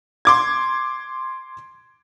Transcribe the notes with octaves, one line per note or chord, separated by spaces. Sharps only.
C6 D6 G#6